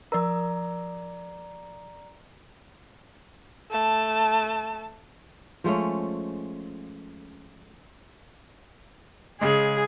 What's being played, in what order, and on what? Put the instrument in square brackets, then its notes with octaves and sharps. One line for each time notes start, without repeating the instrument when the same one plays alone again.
[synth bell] F3 E6 [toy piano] A#4 [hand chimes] D5 A#5
[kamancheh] A3 A5
[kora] F3 G#3 A3 C#4
[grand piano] C#3 G#3 [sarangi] G#4